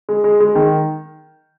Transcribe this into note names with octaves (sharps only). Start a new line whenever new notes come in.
G#3
G#3
G#3
D#3